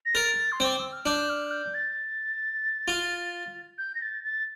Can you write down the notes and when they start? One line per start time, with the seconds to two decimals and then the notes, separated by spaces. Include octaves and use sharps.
0.05 A#6
0.15 A#4 A6
0.52 C6
0.60 C4 D6
0.79 E6
0.92 F6
1.06 D4 G6
1.29 F6
1.51 G6
1.74 A6
2.88 F4
3.78 G6
3.95 A#6
4.02 A6
4.24 A6